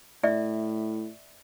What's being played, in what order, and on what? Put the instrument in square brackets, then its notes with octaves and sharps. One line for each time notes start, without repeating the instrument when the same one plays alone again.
[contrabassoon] A2 [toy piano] D5 E5